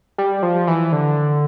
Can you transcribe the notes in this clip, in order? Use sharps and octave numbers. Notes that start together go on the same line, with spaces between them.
G3
F3
E3
D3